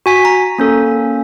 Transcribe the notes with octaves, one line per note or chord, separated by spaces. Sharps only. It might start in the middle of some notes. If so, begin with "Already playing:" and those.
F#4 G#5 B6
A#5
A#3 C#4 A4